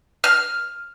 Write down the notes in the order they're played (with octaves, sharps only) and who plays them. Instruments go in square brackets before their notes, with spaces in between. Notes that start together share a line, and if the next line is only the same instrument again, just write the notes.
[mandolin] F6